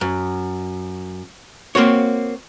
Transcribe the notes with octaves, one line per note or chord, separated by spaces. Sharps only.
F#2
A#3 C4 F#4 C#5